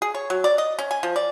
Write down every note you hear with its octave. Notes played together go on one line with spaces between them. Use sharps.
G#4
C#5
F#3
D5
D#5
C#4
G#5
F3
D5